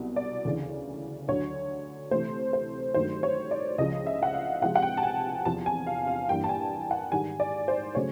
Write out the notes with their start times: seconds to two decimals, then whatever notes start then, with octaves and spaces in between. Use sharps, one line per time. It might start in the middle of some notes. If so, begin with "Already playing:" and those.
Already playing: C2 B2 F#3
0.16 D5
0.45 D2 C#3 E3
1.28 D2 D3 F#3 C#5
2.11 C3 E3 A3 C5
2.53 C5
2.94 G2 D#3 F#3 A3 C5
3.23 C#5
3.51 D5
3.78 C#2 C#3 F3 D#5
4.06 E5
4.23 F#5
4.34 F5
4.61 C3 F3 G#3 F#5
4.76 F#5
4.82 G5
4.97 A5
5.03 G#5
5.45 E2 C3 F3 A5
5.66 G#5
5.87 F5
6.07 F5
6.29 G2 E3 G3 A#3 G5
6.44 A5
6.49 G#5
6.91 F#5
7.12 G#2 D#3 G3 G#5
7.40 D5
7.68 C5
7.95 C#3 F#3 A3 C#4 C#5